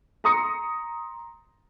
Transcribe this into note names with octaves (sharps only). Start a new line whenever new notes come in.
A#5 C6 D#6 A#6 C#7